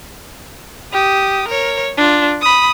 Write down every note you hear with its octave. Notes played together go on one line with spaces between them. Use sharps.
G4 D#6
A#4 C#5
D4 F4
B5 D#6